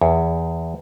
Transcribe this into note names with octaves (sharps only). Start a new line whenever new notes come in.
E2